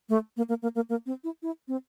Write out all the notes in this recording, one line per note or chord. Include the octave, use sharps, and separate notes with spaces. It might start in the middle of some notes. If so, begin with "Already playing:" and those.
A3
A#3
A#3
A#3
A#3
A#3
C4
E4
E4
C4